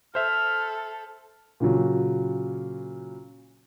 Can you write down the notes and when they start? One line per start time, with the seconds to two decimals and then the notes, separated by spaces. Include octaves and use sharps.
0.15 A4 C5 E5 F6
1.60 A#2 C#3 F#3